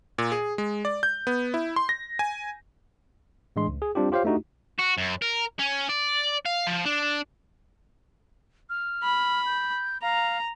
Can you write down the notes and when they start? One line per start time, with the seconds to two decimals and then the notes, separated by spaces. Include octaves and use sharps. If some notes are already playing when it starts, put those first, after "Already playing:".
0.18 A#2
0.32 G#4
0.58 G#3
0.85 D5
1.03 G6
1.27 B3
1.54 E4
1.76 C6
1.89 A#6
2.19 G#5
3.56 A2 E3 G#3 D4 C6
3.68 C#2
3.82 G#4
3.95 G3 C4 D4 F4 G4
4.12 F4 G4 C5 C#5 F5
4.24 A3 D4 D#4 F#4 G4
4.79 F#4
4.97 F#2
5.22 A#4
5.59 C#4
5.89 D5
6.45 F5
6.67 F3
6.86 D4
8.70 F6
9.03 B5
9.46 G6
10.02 F5 A#5